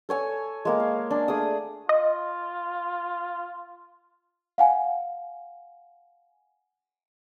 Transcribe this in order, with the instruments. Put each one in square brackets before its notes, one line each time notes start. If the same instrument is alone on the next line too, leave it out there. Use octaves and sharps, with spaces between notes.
[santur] A4 C#5 G#5 E6
G#3 A#3 A#4
F5
D4
A3 G#4 D5 D#6
[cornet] F4 [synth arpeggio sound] D#5
[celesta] F5 F#5 G#5